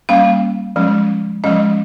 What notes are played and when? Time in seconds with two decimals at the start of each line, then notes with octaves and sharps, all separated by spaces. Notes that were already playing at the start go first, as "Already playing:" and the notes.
0.09 G3 A#3 C#4 F5
0.76 F3 G#3 C#4
1.44 F3 G#3 C#4 D#5